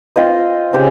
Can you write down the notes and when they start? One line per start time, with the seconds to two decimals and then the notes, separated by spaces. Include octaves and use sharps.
0.16 C4 F4 C5 D#5
0.73 C#3 C4 G4 C5